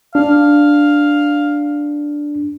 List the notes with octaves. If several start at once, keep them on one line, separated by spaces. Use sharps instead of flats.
D4 F5